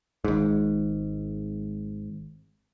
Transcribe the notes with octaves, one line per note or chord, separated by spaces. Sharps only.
G#1 G#2